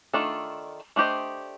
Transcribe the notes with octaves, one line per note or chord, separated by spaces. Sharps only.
D#3 A3 D4 F4 A4
A3 D4 G4 C5 D#5